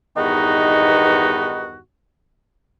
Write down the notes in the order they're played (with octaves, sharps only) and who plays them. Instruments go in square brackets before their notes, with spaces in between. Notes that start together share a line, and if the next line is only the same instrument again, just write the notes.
[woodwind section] E2 G2 D#3 B3 D#4 F#4